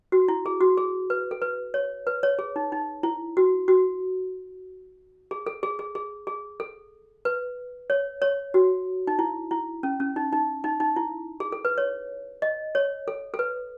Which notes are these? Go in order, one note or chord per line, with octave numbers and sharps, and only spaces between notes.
F#4
E4
G#4
F#4
G#4
B4
A4
B4
C#5
B4
C#5
G#4
D#4
D#4
E4
F#4
F#4
G#4
A4
G#4
G#4
G#4
G#4
A4
B4
C#5
C#5
F#4
D#4
E4
E4
C#4
C#4
D#4
D#4
D#4
D#4
E4
G#4
A4
B4
C#5
D#5
C#5
A4
A4
B4